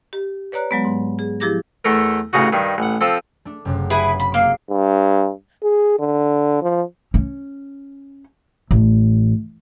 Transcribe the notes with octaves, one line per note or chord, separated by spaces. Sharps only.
G4
B4 C#5 D5 A#5 F#6
F#3 G#3 B3
G#2
G#4
F3 E4 G4 G#4 D6 A#6
E2 A3 A4 A#4
A1 C#3 D#4 F#4
G2 D#3
A1 F#5
F3 C4 A4
A3 D4
F#1 F#2 C3
E4 G#4 B4
B5
G#3 A#3 E6 C7
G2
G#4
D3
F3
C#4
A1